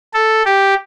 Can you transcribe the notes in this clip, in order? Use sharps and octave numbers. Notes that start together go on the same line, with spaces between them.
A4
G4